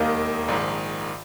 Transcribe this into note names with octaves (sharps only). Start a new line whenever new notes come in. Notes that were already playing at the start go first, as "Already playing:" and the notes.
Already playing: E1 D#2 D#3 A#3 D#4
A#1 G#2 D#3